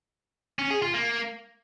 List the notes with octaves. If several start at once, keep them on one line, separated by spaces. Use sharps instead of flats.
C#4
G#4
F4
A#3